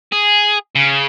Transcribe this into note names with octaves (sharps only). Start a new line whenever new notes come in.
G#4
C#3